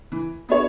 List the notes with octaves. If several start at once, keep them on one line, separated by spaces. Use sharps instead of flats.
E3
B3 D4 F#4 C#5